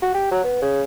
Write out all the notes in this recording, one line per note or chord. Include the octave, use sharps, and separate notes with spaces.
F#4
G4
F#3
B3
C#3